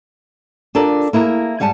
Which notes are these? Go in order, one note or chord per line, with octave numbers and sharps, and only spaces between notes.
D4 F4 G4 A4 A#4 D5
A#3 E4 G#4 A#4
G#2 G3 F#5 G#5 A5